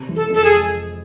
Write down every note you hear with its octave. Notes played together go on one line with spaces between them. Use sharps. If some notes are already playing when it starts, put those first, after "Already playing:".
Already playing: C3
E3
A4
F2 A4
G#4
G#3